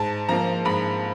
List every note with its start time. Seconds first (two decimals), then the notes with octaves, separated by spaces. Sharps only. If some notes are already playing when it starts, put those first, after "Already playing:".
Already playing: G#2 A5
0.29 F3 A#3 A#5
0.65 G#2 B5